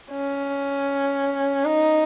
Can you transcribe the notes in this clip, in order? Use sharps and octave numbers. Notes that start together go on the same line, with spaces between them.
C#4
D#4